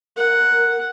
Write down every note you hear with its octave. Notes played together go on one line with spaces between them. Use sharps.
A#4 F#5